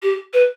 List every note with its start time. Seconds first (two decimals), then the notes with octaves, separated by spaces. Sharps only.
0.02 G4
0.33 B4